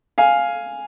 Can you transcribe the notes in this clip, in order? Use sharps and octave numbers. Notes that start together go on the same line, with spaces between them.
F5 G#5